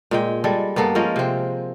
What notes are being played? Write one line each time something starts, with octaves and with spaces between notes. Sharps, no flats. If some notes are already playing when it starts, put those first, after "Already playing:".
A#2 G#3 G5
G3 G#3 A4
G2 A#3 B3 A4
F3 G#3 C#4 A#4
C3 C4